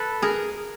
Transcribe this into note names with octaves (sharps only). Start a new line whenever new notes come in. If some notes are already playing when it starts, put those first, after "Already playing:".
Already playing: A4 B4
G#4 A#4